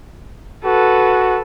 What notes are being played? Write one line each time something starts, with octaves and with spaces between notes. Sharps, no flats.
F#4 A4 B4